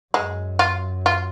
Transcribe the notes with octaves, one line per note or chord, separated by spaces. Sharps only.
F#2 G#3
F4
F4